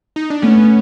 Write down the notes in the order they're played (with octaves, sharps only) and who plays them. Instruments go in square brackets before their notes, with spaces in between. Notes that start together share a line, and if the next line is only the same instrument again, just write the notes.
[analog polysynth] D#4
D4
[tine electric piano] A3 [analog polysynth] B3 C#4